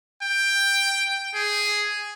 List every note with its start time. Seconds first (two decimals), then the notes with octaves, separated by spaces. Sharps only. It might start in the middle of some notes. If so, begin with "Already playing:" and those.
0.22 G5
1.34 G#4